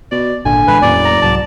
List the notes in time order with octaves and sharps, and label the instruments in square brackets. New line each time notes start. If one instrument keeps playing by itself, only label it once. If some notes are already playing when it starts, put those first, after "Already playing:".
[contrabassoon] B2 [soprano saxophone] D5
[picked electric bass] G#1 A#2 [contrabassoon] D3 [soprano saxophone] G#5
[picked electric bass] A2 E3 G#3 [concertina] B4
[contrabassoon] F#1 [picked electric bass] E2 A2 A#3 [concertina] D5
[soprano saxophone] A#5
[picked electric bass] C2 G#2 F#3 [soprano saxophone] A5